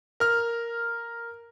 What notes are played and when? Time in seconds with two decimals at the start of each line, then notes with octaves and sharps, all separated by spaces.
0.20 A#4 F6